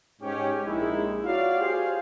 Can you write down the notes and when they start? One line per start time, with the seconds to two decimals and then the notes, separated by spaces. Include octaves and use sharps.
0.22 G#2 C#4 G4
0.66 A#1 G#3 D#4 E4
1.26 F4 F#4 C#5 D5 F5
1.59 G4 G#4 C5 F5